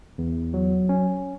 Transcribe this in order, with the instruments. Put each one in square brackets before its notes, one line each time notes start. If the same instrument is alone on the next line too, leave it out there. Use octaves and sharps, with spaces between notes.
[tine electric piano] E2
F#3
C#4